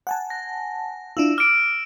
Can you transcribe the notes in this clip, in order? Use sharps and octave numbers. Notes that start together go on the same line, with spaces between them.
F#5 G#5 A5
A#6
D4 E4 F4 E6 E7
D6 F6 D7